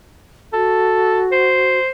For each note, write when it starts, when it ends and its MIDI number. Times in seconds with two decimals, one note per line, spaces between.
0.53 1.79 66
0.53 1.25 69
1.32 1.90 72